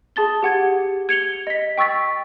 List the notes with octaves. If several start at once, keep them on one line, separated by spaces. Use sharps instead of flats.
G#4 A5 A6 G7
G4 F#5 G#6
G#6 C#7 F7 G7
D#5 B6
G5 C#6 E6 A6 B6